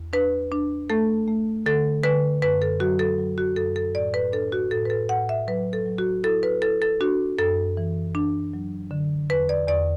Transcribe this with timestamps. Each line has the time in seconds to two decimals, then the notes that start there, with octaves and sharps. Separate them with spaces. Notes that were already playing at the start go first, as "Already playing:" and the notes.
Already playing: E2
0.13 D4 B4
0.52 D4
0.90 A3 A4
1.28 A3
1.66 D3 A4
2.04 D3 B4
2.42 F#2 B4
2.62 A4
2.80 F#3 F#4
2.99 A4
3.19 F#3
3.38 F#4
3.56 F#2 A4
3.76 A4
3.95 A2 D5
4.14 B4
4.32 D4 A4
4.52 F#4
4.71 A2 A4
4.85 B4
4.90 A4
5.09 A2 F#5
5.29 E5
5.48 F#3 B4
5.73 A4
5.86 F#3
5.98 F#4
6.24 E4 A4
6.43 B4
6.62 E4 A4
6.82 A4
7.01 D4 F#4
7.38 F#2 A4
7.77 E3
8.15 D4
8.53 F#3
8.91 D3
9.30 E2 B4
9.49 D5
9.68 E2 D5